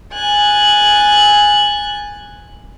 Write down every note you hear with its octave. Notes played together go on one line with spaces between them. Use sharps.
G#5 F#6 A6